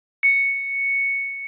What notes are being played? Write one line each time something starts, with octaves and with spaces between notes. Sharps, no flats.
C#7